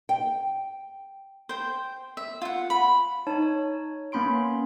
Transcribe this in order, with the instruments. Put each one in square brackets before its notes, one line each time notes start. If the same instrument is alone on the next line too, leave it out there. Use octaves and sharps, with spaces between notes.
[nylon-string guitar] G5
[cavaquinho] C5 G5
E5
F4 F#5
B5
[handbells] D#4 C#5 A5
C#5
A#3 B3 C#4 B5 C6 D7